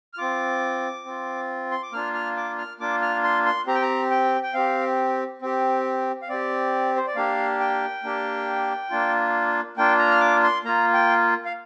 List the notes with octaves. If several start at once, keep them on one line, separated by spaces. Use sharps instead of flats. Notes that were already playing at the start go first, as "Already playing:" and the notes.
F6
C4 F4 D6
C4 F4
C6
D6
A#3 D4 F4 F6
F6
D6
F6
A#3 D4 F4 D6
F6
C6
C6
C4 G4 A#5
G5
A#5
G5
G5
C4 G4 F5
C4 G4
F5
C4 G4 D5
C5
D5
A#3 D4 G4 F5
G5
A#3 D4 G4
A#3 D4 F4
A#3 D4 F4 G5
A#5
F6
D6
C6
A#3 F4 A#5
G5
F5